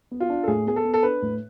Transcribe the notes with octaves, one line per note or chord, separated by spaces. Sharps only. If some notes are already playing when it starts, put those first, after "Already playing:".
B3
F4
D4
A4
A2 G#4
B3 G#4
A4
B3
A4
D4 B4
A2